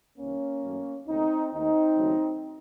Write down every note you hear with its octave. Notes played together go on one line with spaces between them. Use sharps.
C2 C3 D#3 A#3 C#4
F#2 D#3 F#3 A3
C#2 C3 D#3 A3 C4 D#4
D#2 D#3 A3 C4 D#4
D#2 C#3 F#3 A3